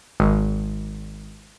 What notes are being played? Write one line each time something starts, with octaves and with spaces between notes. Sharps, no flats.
G#1